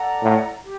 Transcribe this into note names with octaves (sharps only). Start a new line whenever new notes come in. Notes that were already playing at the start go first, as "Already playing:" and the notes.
Already playing: A4 D5 F#5 A#5
A2
G4